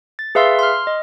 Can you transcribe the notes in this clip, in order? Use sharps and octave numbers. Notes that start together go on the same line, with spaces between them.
A6
G#4 B4 E5 F5 C6 E6
C6 F6
D#5